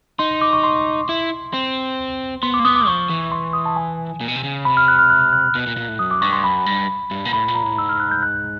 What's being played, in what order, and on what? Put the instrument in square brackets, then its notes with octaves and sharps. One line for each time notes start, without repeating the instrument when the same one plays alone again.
[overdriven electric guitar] D#4 [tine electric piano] C6
[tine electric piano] D6
C#6
C6
[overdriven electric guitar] E4
[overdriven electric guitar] C4 [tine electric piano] C6
[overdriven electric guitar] B3 [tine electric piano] C6
[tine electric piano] D6
[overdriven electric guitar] A#3
[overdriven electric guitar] B3 [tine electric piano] D#6
[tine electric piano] D6
[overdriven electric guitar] F3 [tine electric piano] C#6
[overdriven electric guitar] E3
[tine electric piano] C6
D#6
A5
G#5
[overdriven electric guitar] A#2
B2
C3
C#3
[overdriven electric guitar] C3 [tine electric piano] B5
[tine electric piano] F6
F#6
F6
F#6
F#6
[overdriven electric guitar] B2
A#2
A#2
A2
[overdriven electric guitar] F#2 [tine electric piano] D#6
[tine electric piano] D6
[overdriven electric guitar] G2 [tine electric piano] C#6
[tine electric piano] C6
[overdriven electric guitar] F#2 [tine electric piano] B5
[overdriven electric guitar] G2
G2
A#2
[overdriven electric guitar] A2 [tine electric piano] B5
[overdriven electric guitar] A#2
[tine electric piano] A#5
[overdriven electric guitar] A2
[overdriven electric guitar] G#2 [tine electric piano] E6
[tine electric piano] F6
F#6
G6
F#6